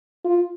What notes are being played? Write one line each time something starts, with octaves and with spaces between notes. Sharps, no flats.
F4